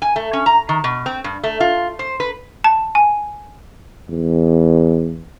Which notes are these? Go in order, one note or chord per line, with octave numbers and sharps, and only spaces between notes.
G#5
A3
C#4
A#5
D#3
B2
C4
G2
A3
F4
C5
B4
A5
G#5
E2